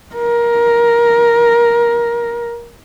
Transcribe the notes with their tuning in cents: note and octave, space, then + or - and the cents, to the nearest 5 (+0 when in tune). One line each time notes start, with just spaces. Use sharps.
A#4 +15